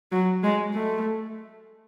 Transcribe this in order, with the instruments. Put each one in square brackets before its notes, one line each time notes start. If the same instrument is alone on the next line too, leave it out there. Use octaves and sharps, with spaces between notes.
[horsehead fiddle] F#3
G#3
A3